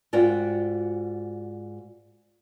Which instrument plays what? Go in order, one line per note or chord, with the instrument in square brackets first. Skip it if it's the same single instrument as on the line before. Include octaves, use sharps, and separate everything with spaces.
[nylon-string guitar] G#2 F4 F#4 D5 G5